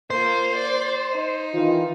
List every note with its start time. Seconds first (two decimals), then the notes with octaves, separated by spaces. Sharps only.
0.10 A#3 F4 C5
0.55 D5
1.11 D#4
1.54 D#3 E3 F4